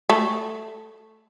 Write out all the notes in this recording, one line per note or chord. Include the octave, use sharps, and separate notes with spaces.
A3